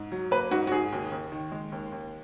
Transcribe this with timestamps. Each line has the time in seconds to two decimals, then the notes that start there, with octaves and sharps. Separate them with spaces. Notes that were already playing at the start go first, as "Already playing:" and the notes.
Already playing: G#2
0.12 F#3
0.31 A#3 B4
0.51 G#2 F#4
0.67 F#4
0.71 G#2 G#4
0.92 D#2
1.12 D#2
1.32 D#3
1.52 G#3
1.72 D#2
1.92 D#2